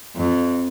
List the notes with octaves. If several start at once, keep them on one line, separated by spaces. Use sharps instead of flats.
F2